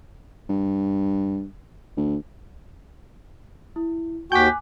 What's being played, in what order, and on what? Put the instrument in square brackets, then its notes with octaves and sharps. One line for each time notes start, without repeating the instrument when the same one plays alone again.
[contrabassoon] G2
D2
[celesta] E4
[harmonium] D#2 F#4 G5 [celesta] G#5 D6 F#6 [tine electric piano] G6 B6